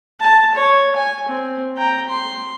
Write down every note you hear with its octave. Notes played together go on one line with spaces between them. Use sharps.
A5
C#5
G#5
C4
G5 A#5
C6